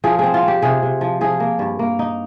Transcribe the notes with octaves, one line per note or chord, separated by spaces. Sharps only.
F3 G#4
C4 G#4
F4
C4
G4
C3 G#4
C3
F3
F3 G#4
A#3
G2
A#3
D#4